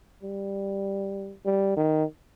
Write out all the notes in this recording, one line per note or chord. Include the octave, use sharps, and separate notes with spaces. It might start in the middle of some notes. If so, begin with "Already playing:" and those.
G3
G3
D#3